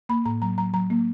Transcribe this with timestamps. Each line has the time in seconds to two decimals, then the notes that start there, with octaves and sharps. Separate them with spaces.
0.09 A#3 B5
0.26 A2 A#5
0.42 F#3 A#5
0.58 F#3 A#5
0.74 F#3 A#5
0.90 A#3